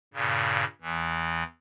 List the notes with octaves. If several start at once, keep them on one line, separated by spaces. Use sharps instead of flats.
G2 A#2 C#3
E2 E3